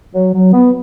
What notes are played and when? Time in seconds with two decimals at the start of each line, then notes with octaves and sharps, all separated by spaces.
0.14 F#3
0.34 F#3
0.53 B3